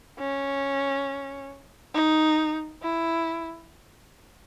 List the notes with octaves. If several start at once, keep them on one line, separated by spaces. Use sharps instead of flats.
C#4
D#4
E4